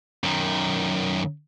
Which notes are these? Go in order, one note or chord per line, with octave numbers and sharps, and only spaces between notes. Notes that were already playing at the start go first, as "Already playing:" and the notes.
F#2 D#3